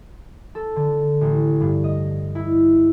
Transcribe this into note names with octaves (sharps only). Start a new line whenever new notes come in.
A4
D3
A1
G2
D#5
E4